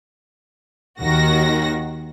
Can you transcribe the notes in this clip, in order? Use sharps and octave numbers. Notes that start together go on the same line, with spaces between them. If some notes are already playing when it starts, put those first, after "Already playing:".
D#2 D#3 F#4 A#6